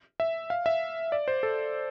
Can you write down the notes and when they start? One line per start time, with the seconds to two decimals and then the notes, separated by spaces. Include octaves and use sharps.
0.20 E5
0.50 F5
0.66 E5
1.12 D5
1.28 C5
1.43 A4